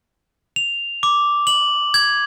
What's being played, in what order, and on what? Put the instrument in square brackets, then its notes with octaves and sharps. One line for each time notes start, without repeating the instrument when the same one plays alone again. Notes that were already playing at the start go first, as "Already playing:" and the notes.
[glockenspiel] F7
D6
F#7
G#6